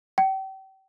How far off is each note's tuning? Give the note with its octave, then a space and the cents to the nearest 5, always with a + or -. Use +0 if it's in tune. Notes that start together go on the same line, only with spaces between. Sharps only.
G5 -35